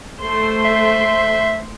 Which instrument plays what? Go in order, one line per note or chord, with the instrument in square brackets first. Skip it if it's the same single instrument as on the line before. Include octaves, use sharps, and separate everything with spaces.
[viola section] A3 C5 C6
[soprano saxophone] E5